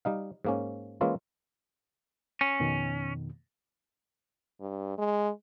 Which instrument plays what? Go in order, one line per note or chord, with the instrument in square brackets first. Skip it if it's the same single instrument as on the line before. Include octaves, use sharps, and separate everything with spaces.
[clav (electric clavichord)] G3 D#4 F5
G#2 A#3 C#4
E3 G#3 A#3 C#4 E4 F4
[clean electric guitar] C#4
[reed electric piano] F2 B2 D#3
[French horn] G2
G#3